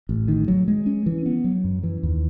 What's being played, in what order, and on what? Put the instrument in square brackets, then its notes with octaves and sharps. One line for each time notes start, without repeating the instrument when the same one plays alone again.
[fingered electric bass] A1
D#3
F#3
G#3
C#4
E3
B3
F#3
F#2
E3
D#2